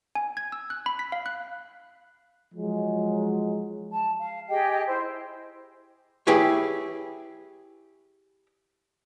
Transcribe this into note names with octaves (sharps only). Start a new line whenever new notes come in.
G#5
G#6
E6
F#6
B5
B6
F5
F#6
F3 F#3 G#3
A5
F5
G4 G#4 D#5 G5
E4 C5
E4 G4 G#4 B4 C#5